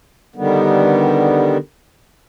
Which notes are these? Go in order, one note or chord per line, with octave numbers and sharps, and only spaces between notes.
D3 D#3 G3 B3